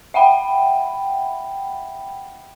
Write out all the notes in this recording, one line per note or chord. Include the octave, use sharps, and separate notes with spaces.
E5 F#5 G5 B5